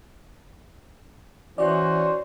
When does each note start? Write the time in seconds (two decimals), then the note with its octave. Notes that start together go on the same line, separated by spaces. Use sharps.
1.58 E3 C#4 D#4 F#4 C5 D5